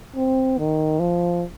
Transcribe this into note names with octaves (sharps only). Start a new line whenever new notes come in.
C4
D#3
F3